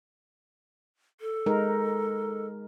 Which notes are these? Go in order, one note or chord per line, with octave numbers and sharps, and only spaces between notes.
A4
G#3 D#4 A#4